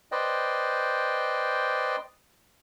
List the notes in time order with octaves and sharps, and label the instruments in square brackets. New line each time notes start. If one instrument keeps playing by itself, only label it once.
[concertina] B4 C5 D5 D#5 G5